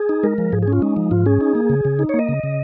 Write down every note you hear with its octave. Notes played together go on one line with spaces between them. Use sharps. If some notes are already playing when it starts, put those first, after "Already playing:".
Already playing: G#4
D#4
G#3 A#4
F3
G#2 G#4
G#4
C#4
F4
G#3 D#4
F3
G#2 F4
C#4 G#4
D#4
A#3
C#3
C#3
D#4
A#3 C#5
D#5
C#3
C#3